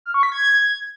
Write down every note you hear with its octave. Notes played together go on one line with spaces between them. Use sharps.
F6
C#6
B6
G#6